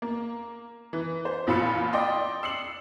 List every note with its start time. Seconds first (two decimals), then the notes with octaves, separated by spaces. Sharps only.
0.02 A#3
0.93 E3
1.25 C5
1.47 A1 A#2 F4 B5 E6 C#7
1.93 D5 D#5 G5 C6
2.43 E6 C7 C#7 F#7